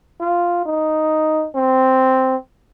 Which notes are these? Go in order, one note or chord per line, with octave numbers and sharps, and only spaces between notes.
F4
D#4
C4